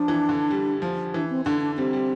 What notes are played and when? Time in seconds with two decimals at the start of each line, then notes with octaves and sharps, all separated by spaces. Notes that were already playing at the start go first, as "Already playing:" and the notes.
Already playing: F3 D4
0.08 E3
0.29 D3
0.50 G3
0.82 F3
1.14 E3 D4
1.30 C4
1.45 D3 D4
1.61 D4
1.77 G3 C4
1.93 G3